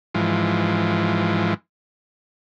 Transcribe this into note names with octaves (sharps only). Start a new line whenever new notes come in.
G#2 E3 F3